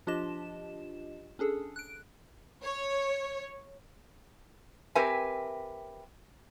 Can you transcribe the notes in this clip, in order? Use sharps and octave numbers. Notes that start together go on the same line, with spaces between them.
F3 D4 F4 G4 D#5 E7
C#4 D4 G#4 A4
F#6 D7
C#5
C4 G4 A#4 B4 E5 G#5